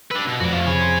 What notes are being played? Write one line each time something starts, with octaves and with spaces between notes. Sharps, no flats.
D4 B4 E6
B2
F2 F#4 D5
F3 A3
C3 G#4 C#5 B5
C6